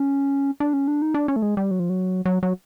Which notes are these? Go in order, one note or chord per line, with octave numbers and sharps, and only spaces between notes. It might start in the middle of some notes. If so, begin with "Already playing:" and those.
Already playing: C#4
D4
C#4
D4
D#4
D4
C#4
A3
G#3
G3
F#3
F3
F#3
F#3
F#3